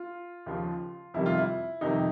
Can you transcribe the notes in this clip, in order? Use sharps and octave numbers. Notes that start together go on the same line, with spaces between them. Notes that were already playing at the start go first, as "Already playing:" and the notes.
Already playing: F4
D#2 C#3 F3
F2 C3 D#3 G3 E4
F4
E4
F2 C3 D#3 G3 D#4